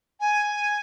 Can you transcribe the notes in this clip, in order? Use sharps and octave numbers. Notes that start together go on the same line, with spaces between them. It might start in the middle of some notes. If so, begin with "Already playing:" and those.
G#5